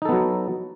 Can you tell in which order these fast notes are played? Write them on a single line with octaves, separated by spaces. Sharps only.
D#4 A4 B3 F#3